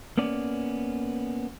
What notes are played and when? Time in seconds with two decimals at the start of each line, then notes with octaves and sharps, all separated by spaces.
0.18 A#3 B3 C#4 D5